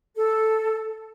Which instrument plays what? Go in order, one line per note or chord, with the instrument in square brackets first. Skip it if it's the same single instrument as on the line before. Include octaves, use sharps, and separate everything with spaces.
[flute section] A4